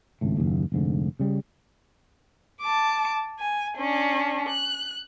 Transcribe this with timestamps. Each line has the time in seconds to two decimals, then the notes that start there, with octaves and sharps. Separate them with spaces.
0.21 G#1 C#2 A2
0.37 F#1 D#2
0.72 F1 G#2 D3
1.20 C#3 G3
2.61 A5 D6
3.39 G#5
3.77 C#4 D4
4.49 F#6